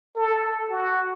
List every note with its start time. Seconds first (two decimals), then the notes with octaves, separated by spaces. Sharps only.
0.16 A4
0.70 F#4